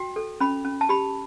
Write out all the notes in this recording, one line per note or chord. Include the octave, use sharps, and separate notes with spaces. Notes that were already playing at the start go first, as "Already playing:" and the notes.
Already playing: F#4 G5
A4
C#4 B5
C#4
A5
G4 B5